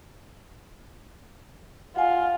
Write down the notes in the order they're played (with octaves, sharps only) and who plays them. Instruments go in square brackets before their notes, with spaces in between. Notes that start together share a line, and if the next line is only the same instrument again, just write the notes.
[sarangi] F4 [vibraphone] F#5 G#5